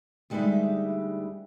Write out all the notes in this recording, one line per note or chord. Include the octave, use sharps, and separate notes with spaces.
D2 G3 G#3 D#4 B4 E5